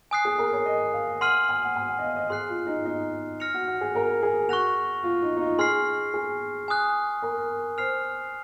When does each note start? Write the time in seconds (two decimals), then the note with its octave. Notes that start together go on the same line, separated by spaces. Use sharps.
0.11 G#5 D#6 F#6 C7
0.25 G#4
0.38 A#4
0.53 C#5
0.66 D#5
0.93 F5
1.20 F#5 C6 F6 C7 D#7 F#7
1.49 G#5
1.65 F#5
1.76 G#5
1.89 F#5
1.99 D#5
2.03 F5
2.16 D#5
2.30 G#4 C6 F#6 C7
2.49 F4
2.67 D#4
2.85 D#4
3.40 F6 A#6 C#7 F7
3.54 F#4
3.67 F#4
3.81 G#4
3.95 A#4
4.23 G#4
4.49 F#4 C#6 F#6 A#6 F7
5.04 F4
5.22 D#4
5.37 D#4
5.41 F4
5.59 G#4 C6 F6 C7
6.14 G#4
6.68 G#5 D#6 F#6
7.22 A#4
7.78 C5 F6 C7 F7